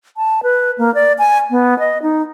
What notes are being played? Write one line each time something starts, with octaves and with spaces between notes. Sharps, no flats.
A5
B4
A#3
D5
G#5
B3
D#5
D#4